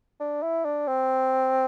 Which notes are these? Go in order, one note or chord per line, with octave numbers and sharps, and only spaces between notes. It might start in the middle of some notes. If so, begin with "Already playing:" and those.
D4
E4
D4
C4